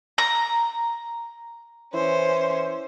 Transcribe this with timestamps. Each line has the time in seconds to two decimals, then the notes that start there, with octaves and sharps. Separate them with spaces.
0.18 A#5
1.94 E3 C#4 C5